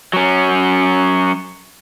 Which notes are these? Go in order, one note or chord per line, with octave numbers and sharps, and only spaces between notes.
F#3 C#4